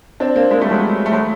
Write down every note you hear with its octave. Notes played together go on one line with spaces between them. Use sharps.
C4 D4
A#3 C4
G#3 A#3
G3 A3
F#3 G#3
A3
F#3 G#3